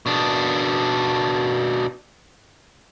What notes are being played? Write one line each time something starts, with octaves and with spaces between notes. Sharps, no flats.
B2 D4